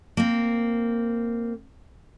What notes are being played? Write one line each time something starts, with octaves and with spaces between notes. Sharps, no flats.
A#3 C4